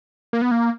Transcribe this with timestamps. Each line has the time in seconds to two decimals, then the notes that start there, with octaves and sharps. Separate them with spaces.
0.33 A#3
0.42 B3
0.51 A#3